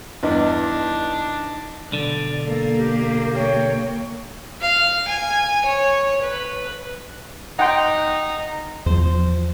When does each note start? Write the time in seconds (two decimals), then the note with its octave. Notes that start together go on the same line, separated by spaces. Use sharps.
0.23 E2 G2 D4 D#4 D#5
1.92 B1 D3 D5
2.46 A#3 A4
2.78 G4
3.35 C#5 G5
4.61 F5
5.08 G#5
5.65 C#5
6.22 B4
7.59 D#4 F#5 G5 C6
8.86 E2 F3 C5